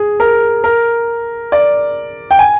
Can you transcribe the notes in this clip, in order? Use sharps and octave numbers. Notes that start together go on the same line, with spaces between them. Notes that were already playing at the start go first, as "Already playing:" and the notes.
Already playing: G#4
A#4
A#4
D5
G5
G#5